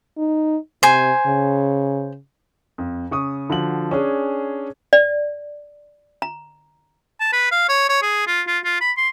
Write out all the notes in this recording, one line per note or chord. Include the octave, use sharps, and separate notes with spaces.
D#4
C3 C5 G#5
C#3
F2
C#3 C#6 D#6
D3 F3 F#4 F#7
C#4 D4 G#4
D5
A#5
A5
B4
F5
C#5
C#5
G#4
F4
F4
F4
B5
C6